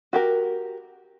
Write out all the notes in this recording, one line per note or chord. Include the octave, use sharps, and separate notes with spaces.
F#4 G4 A#4